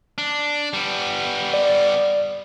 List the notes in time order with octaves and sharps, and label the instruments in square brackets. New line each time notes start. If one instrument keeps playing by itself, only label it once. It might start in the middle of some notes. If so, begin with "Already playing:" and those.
[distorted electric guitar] D4
G3 B3
[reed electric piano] D5